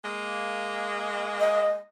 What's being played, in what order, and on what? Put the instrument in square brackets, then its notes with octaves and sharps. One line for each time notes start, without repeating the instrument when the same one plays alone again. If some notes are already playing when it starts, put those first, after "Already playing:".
[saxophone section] G#3 A#3
[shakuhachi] D#5